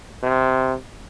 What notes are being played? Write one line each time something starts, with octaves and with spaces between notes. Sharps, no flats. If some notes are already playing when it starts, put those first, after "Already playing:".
C3